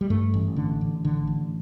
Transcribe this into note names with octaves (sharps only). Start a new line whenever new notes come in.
G3
G2 A3
A1
D3
A1
D3
A1